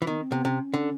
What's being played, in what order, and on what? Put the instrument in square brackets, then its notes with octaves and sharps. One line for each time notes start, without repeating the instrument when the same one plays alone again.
[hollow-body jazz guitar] E3
[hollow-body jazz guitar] D#3 [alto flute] B3
[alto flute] C4
[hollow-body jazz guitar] C3 [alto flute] B3
[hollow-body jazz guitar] C3 [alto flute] C#4
[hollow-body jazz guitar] D3